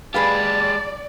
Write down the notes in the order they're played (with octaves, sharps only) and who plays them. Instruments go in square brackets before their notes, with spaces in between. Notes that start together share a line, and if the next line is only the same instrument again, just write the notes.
[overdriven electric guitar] G#3 G4 [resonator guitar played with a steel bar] G#4 B4 F5 [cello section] D5 [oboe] A5